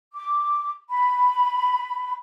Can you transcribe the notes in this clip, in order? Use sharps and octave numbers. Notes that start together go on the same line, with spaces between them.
D6
B5